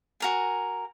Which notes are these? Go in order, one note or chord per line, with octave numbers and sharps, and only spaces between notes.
F#4 A#4 G#5